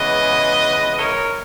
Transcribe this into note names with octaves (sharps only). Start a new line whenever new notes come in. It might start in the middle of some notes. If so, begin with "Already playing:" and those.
Already playing: C#3 E3 G#3 B3 B4 D#5
A#4 C#5